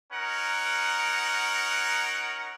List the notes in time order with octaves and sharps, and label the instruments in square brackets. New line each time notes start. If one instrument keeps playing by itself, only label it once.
[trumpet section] C#4 D#4 A#4 F#5